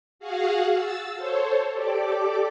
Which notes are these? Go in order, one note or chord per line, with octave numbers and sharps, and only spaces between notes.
F#4 G#4 F5 F#5
E6 A6
A4 C5 C#5
G4 A4 D5 D6